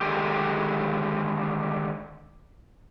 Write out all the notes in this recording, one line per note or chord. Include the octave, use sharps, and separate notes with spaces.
D3 D#3 G#3 G4